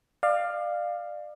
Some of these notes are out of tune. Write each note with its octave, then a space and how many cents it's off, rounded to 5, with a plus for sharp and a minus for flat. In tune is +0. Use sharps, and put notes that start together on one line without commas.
D5 +30 F5 +0